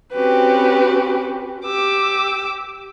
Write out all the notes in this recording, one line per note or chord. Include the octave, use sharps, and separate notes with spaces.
C4 C#4 F#4 G4 B4
G4 D6 E6